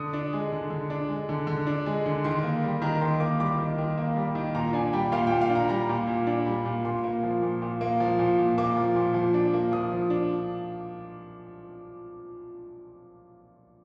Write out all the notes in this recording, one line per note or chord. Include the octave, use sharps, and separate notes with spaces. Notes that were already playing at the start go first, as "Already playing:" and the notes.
Already playing: D3 D#6
D4
G#3
D3
D3
D4
G#3
D3
D3
D4
G#3
D3
D#3 C6
A#3
G3
D#3 A#5
D#3 C6
A#3 D6
G3 D6
D#3
D#3
A#3
G3
D#3
A#2 A#5
D4 G#5
G3 G5
A#2 F5
G5
A#2
F5
D4
A#5
G3 A#5
A#2
A#2
D4
G3
A#2
A#2 C6
A#3
F3
A#2
A#2
A#3
F3
A#2
A#2
A#3 D6
F3
A#2
F3
D4
A#3
F3 D#6
F3
D4